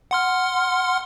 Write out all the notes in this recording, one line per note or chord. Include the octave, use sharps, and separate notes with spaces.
F#5 C6 F6